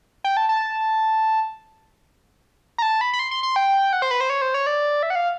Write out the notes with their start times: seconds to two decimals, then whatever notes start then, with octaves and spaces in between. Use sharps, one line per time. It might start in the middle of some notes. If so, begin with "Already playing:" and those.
0.24 G5
0.37 A5
0.49 A5
2.78 A#5
2.82 A5
3.01 B5
3.13 B5
3.19 C6
3.31 C6
3.43 C6
3.56 G5
3.93 F#5
4.02 C5
4.11 B4
4.21 C5
4.30 C#5
4.42 C5
4.54 C#5
4.67 D5
5.03 E5
5.10 F#5
5.15 F5